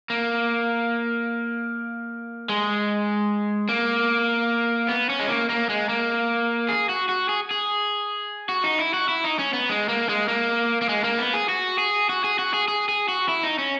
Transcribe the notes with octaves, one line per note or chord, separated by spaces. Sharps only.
A#3
G#3
A#3
B3
C#4
G#3
A#3
A#3
G#3
A#3
G#4
F#4
F#4
G#4
G#4
F#4
D#4
E4
F#4
E4
D#4
C#4
B3
G#3
A#3
G#3
A#3
A#3
G#3
A#3
B3
G#4
F#4
G#4
F#4
G#4
F#4
G#4
G#4
G#4
F#4
E4
D#4
C#4